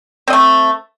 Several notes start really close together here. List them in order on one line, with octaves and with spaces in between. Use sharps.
C4 D#5 A3